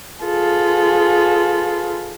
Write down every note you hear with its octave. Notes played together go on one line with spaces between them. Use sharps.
F4 G#4 A4 B4